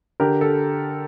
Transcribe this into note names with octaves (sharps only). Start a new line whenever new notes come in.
D3 G4 A#4
A4